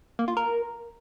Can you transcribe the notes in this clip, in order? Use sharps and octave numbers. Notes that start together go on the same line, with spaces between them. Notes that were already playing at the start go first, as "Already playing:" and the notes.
A#3
F4
A#4